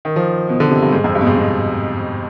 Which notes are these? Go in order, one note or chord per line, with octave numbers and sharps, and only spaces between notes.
D#3
F3
B2
D3
C3
G2
G#2
F2
G2
B2
G#2
B2